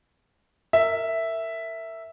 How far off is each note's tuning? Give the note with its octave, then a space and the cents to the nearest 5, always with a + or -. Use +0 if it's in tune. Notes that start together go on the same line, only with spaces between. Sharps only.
A#4 -30 E5 +0